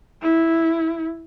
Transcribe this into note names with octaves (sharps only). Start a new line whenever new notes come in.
E4